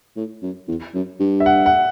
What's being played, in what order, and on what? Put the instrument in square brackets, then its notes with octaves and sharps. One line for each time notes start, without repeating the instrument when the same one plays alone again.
[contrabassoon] A2
F#2
E2
F#2
G2
[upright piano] E5
F#5
F#5